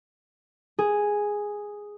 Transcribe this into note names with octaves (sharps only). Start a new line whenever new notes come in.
G#4